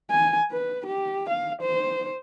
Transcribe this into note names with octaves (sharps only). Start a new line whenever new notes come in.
G#5
B4
G4
F5
C5